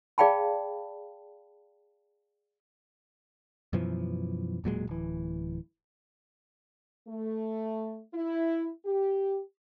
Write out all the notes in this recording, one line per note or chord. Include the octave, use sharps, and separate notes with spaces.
G#4 D5 F5 G5 A5 B5
F#2 B2 E3 F3
E1 A#2 F#3 G#3
D1 E3
A3
E4
G4